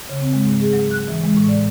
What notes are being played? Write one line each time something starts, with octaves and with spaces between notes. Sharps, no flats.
C#3
C4
G#3
G#2
G#4
F#3
F#6
E3
G#3
A2
D5